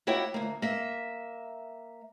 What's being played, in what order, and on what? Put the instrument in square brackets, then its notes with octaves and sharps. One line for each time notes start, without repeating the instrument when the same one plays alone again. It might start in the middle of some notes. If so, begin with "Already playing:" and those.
[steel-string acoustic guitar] A#3 E4 F#4 C#5 F#5 G5
D2 A#3
A#3 E5